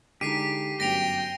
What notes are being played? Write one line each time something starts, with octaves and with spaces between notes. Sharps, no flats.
D3 G#3 D#4 G4 B6 C7 D#7
G1 F#2 G5 A#6 D7 F7